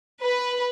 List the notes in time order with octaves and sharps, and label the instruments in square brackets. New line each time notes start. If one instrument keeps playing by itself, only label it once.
[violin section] B4